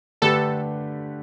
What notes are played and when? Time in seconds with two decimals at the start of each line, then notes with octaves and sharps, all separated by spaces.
0.22 D3 A3 D4 G4 A4 B4